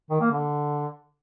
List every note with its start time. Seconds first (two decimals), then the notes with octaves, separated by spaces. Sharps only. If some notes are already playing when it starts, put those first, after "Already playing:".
0.10 D#3
0.21 A#3
0.32 D3